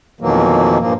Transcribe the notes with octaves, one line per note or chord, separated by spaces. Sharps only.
F2 B2 D#3 E3 F#3 A#3
G2 A#2 F3 A#3